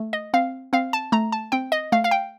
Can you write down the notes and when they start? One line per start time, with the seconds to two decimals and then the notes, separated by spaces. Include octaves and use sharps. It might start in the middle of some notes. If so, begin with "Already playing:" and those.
Already playing: A3
0.13 D#5
0.33 C4 F5
0.73 C4 F5
0.93 A5
1.12 A3 A#5
1.32 A5
1.52 C4 G5
1.72 D#5
1.92 A3 F5
2.04 F5
2.11 G5